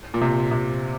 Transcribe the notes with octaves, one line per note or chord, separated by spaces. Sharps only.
A#2
C3
C3